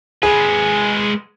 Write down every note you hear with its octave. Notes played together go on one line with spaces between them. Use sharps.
G#3 G#4 B4